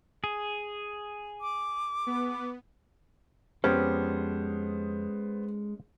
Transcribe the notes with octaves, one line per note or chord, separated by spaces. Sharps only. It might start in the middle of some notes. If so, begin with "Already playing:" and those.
G#4
D6
B3
F2 G#3 B3 C#4 G4 A4 C5